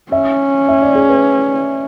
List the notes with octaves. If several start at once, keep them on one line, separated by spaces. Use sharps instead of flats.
C#4 E5
E5
D5
G#4
B4